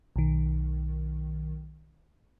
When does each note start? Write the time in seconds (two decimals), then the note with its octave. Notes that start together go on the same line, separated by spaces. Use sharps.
0.16 B1 D#3